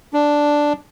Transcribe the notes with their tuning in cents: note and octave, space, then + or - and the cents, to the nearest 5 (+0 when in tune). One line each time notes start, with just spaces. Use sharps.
D4 +0